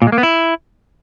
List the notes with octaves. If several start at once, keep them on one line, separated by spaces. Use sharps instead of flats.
A#2
G#3
A#3
B3
E4